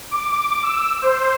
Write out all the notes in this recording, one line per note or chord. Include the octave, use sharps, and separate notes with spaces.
D6
E6
C5